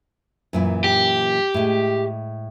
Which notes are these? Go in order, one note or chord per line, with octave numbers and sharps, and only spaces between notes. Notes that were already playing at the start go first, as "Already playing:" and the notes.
F#2 A#2 E3
G4
A2 G#3